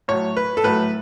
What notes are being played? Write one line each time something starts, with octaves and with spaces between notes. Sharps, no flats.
A2 F#3 C#5
B4
A4
A2 F#3 B4